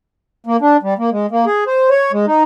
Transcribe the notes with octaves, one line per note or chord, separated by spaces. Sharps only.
A#3
D4
G3
A#3
G#3
A#3
G#4
C5
C#5
G#3
D#4